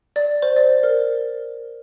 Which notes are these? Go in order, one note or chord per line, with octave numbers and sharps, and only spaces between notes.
D5
C5
D5
A#4